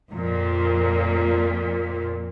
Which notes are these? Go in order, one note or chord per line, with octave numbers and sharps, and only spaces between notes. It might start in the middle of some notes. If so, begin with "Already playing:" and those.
F2 A#2